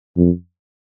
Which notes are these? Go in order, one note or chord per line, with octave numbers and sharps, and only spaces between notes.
F2